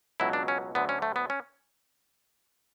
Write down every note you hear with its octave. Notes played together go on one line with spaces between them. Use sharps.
C#2 B2 F#3 E4
D4
C#4
D2 D3 F#3 B3
C#4
A3
B3
C#4